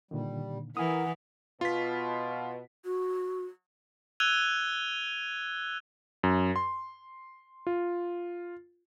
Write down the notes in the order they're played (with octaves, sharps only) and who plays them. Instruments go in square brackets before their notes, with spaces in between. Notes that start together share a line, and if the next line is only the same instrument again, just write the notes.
[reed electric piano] A#2 D3 D#3 [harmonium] G3
[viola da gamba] E3 [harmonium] E4 A#4 [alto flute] F#5 [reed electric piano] G#5 D#6
[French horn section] B2 [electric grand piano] F4 B6 [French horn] B4
[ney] F#4
[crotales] E6 F#6 G#6 D#7 F7 G7
[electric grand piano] F#2
C6
F4